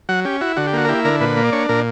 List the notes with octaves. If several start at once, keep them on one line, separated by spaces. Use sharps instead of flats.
F#3 F#5
C#4 G4
E4 F#4
D3 F#4
G4
A#3 F#4
A#4
E4 G4
D3 A#4
A#2 B4
A#3
D5
D4 C#5
A#2 A#4